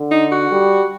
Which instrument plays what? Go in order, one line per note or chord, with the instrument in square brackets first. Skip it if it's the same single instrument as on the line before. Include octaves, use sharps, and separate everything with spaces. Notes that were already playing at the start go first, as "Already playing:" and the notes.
Already playing: [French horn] D3
[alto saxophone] D#4
F#4
[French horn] G3